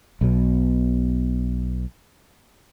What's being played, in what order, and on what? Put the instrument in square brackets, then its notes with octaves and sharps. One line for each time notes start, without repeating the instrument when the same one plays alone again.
[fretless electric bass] B1 B2